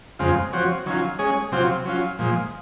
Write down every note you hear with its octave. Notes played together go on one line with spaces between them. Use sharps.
F2 C#3 G#3 C4 F4
F3 C4 F#4 C#5
D#3 F#3 C#4 F4
G#3 C#4 G#4 C#5
C3 F#3 C4 F4
F#3 C#4 F4
A#2 F3 G#3